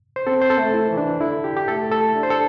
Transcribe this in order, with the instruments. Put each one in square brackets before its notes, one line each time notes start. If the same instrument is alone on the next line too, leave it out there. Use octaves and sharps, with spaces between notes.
[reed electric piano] C5
[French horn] C4 [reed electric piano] A4
[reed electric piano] C5
A4
[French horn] A3
[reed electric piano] E4
[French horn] E3
[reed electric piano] D4
[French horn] D3 [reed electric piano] E4
[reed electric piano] G4
G4
[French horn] A3 [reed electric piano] A4
[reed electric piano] A4
[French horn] D4
[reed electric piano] C5
A4